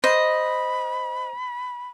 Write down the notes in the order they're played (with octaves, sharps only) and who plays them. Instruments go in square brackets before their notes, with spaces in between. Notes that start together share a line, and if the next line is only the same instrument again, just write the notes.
[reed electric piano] C5 [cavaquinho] D#5 [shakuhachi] B5